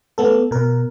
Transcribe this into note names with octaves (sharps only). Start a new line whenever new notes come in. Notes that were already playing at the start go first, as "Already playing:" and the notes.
A3 B3 A4
B2 A#4